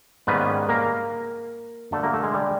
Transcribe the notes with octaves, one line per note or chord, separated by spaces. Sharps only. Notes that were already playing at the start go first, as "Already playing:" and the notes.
G#2 D#3 G3 A#3 B3 C#4 B4
A#3 A#4
D3 F#3 A3 A#3 A4
A#3 A#4
A3 A4
G#3 G#4
G3 G4